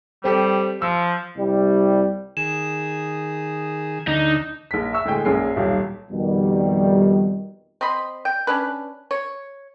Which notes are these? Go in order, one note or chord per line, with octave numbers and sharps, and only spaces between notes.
G3 C4 G4 A4
F3 E6
C2 G3
D#3 G#4 E7
D2 D3 D#4
A#1 B6
E5 C#6 E6
D2 A2 G#3 G#4 G5
A#1 F#2 G#4 C#5 C7
D#1 B1 G4
F2 B2 D#3 G3
C4 D#5 B5 C6
G5
C#4 D4 B4
C#5